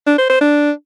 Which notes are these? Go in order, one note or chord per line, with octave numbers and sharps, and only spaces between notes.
D4
C5
C5
D4